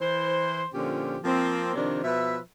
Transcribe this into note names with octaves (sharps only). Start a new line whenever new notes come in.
E3 C5
A#2 D3 F3 C#4 G4
F3 A#3 C4
C3 D#3 F3 D4
B2 F3 B4 E5